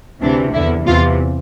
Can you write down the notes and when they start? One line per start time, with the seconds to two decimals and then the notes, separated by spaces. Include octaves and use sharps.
0.21 D2 C3 E3 D4
0.54 E2 D3 E4
0.87 E2 C3 E3 F4